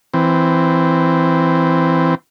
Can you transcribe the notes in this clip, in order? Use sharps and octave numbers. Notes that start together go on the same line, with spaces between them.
E3 C4